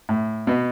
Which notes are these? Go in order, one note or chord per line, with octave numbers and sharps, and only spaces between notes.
A2
B2